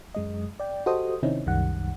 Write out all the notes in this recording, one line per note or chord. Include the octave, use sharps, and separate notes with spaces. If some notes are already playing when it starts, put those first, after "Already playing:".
F#2 G#3 D#5
D5 G5
F#4 G4 A4 C5 D#5 D#6
C3 D#3 C4 C#4 D#4 E4
C2 F#2 D#3 G3 F#5